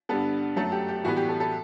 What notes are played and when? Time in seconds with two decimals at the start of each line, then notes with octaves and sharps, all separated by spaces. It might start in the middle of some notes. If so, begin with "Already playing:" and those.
0.09 G2 D3 G3 B3 A4
0.56 F#2 F#3 A3 A4
0.72 G4
0.89 G4
1.04 A2 E3 G3 B3 F#4
1.17 G4
1.29 A4
1.40 A4